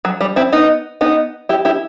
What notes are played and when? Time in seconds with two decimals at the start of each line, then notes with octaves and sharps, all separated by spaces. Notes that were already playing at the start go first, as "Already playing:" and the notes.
0.05 F#3
0.21 G3
0.36 C4 E4
0.52 B3 D#4
1.01 B3 D#4
1.49 E4 G4
1.65 E4 G4